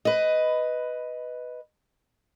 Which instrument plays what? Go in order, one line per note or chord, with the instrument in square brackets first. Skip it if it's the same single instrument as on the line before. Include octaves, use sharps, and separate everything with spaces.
[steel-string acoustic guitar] B4 D#5